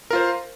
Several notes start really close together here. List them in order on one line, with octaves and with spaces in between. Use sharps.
A#4 F4 C5